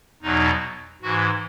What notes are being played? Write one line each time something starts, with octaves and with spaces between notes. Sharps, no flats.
E2 B2 F#3 D#4
G#2 E3 F#4